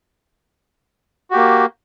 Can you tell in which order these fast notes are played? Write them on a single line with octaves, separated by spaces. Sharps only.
F#4 G4 A#3